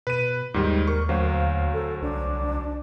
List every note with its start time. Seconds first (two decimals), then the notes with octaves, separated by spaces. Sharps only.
0.07 B2 B4 D#7
0.54 D#2 G#2 D#3 G3
0.87 A#4 C#6
1.09 D2 F#3 C5 F5
1.73 A4
2.02 C2 D4